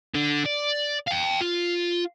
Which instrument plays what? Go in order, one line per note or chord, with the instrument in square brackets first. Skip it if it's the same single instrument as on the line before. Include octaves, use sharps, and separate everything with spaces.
[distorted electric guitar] D3
D5
F5 G5
F4